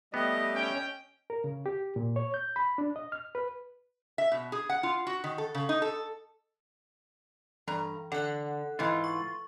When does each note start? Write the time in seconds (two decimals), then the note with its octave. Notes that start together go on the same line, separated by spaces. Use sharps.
0.14 G3 A3 B3 G4 D#5
0.55 C#4 G5
1.30 A#4
1.44 C#3
1.66 G4
1.96 A#2
2.16 C#5
2.34 G6
2.56 B5
2.78 D4
2.96 D#5
3.12 F6
3.35 B4
4.18 E5
4.32 B2
4.52 G#4
4.70 F#5
4.83 F4
5.07 F#4
5.24 D#3
5.38 A4
5.55 C#3
5.69 D#4
5.82 A4
7.68 G2 E3 A#5
8.12 D3 A4 F#5 F#6
8.79 G#2 E3 F4
9.04 C#6